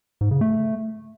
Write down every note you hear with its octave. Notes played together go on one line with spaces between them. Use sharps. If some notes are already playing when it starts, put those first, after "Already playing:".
G#2
C#3
A3